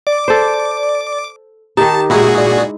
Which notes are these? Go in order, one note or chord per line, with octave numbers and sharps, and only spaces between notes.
D5 D6
A4 C5
D#3 D#4 G4 A5
A#2 G#3 D#4 E4 F#4 G#4
D5